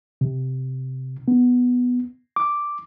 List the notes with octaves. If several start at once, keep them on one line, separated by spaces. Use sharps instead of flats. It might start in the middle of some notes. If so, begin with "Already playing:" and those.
C3
B3
D6